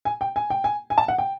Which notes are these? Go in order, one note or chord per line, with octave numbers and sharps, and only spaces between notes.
G#5
G5
G#5
G5
G#5
G#5
A5
F#5
G5